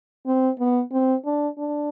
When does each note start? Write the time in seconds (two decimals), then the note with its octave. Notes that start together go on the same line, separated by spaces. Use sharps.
0.26 C4
0.59 B3
0.91 C4
1.25 D4
1.58 D4